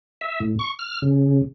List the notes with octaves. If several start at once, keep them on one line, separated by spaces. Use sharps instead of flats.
E5
A2
C#6
F6
C#3